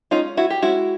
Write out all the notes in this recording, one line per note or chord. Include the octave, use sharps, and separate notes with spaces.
G#3 C#4 D#4 F4
E4 F#4
G4
G#3 C#4 E4 F#4